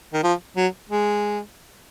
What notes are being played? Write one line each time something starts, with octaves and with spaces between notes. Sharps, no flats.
D#3
F3
F#3
G#3